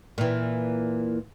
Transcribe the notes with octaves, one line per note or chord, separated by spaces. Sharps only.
A#2 E3